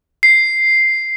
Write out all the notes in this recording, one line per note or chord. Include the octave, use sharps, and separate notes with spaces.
C7